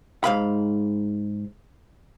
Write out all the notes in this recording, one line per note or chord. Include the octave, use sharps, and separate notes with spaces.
G#2 F5 B5